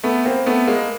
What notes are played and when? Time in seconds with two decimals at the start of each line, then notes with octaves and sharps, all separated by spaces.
0.04 A3 B3
0.25 A#3 C4
0.46 A3 B3
0.67 G#3 A#3